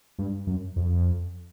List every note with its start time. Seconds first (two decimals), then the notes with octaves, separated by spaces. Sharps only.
0.19 G2
0.47 F#2
0.76 F2